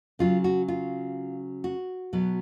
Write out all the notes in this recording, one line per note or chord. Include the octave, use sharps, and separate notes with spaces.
C#3 F#3 F4
F#4
F4
F#4
B2 F#3